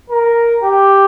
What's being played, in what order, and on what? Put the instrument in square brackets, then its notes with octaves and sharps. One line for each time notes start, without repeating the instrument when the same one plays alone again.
[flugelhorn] A#4
G4